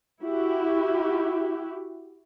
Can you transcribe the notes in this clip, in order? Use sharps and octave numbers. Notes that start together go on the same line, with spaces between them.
E4 F#4 G4